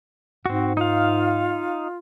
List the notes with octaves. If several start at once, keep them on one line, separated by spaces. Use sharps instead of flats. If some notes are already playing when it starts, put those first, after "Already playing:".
G#2 C4 F#4
D#4 F4 F5